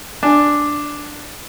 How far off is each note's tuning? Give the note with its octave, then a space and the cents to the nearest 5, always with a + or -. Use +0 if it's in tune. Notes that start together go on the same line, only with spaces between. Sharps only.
D4 +0 G#5 +0